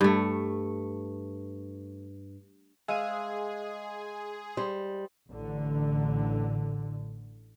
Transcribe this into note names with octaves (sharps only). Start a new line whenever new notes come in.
G2 A3
G#3 G#4 E5 F5 D#7
G3 C5
A1 D3